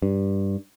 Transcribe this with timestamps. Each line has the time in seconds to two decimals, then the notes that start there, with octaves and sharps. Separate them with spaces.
0.02 G2